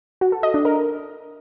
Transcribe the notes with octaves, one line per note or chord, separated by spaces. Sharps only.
F#4
A4
D#5
D4
A#4